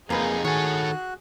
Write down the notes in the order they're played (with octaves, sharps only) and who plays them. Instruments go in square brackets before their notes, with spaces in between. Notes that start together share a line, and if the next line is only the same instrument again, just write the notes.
[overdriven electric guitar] F2 D#4 [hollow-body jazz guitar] A#3 B4 [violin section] G#4
[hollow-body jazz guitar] D#3 [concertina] F#4 F#6 [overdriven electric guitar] A4 C#5